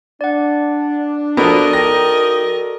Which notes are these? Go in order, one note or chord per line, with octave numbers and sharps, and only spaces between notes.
D4 D5 F#5
F3 B3 F#4 A4 A#4 D5 D#5
F3 D#4 G5 A#6